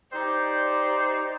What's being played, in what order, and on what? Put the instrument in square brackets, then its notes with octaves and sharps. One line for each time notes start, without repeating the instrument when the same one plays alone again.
[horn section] D#4 G4 C5 D5